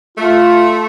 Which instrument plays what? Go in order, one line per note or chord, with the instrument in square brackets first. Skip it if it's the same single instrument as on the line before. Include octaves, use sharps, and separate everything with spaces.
[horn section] A3 [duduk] F4